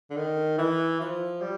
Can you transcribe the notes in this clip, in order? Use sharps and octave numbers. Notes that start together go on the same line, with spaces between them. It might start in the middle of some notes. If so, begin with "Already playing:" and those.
D3
D#3
E3
F3
G3